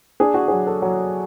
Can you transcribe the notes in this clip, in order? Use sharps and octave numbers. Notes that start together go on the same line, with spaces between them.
D4 G#4
F#4
F#3 G#4
A4
F#3